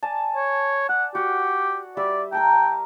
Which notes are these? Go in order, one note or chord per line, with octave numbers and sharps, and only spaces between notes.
D5 G#5 A5
C#5
D5 F#5
F#4 G4 F#5
G3 G4 D5 E5
A#4 G5 A5 A#5